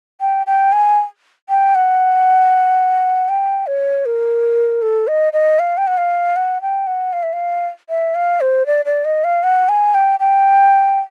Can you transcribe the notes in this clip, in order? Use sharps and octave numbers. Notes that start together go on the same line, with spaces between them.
G5
G5
G#5
G5
F#5
G5
C#5
A#4
A4
D#5
D#5
F5
G5
F#5
F5
F#5
G5
F#5
F5
E5
F5
E5
F5
C5
D5
D5
D#5
F5
F#5
G#5
G5
G5